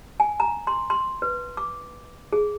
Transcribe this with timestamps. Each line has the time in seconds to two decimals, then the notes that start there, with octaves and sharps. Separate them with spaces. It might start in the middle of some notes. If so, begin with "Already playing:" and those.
0.20 G#5
0.40 A#5
0.67 C6
0.90 C6
1.22 B4
1.57 D6
2.33 G#4